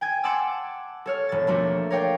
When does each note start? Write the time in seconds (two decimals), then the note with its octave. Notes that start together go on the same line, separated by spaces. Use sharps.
0.01 G5 G#5 G#6
0.23 F#5 A5 C6 D6 E6
1.06 A4 C#5 F6
1.29 E1 A6
1.47 F3 A3 A#3 D4 F#4 A4
1.90 A#4 C#5 D5 F5 G5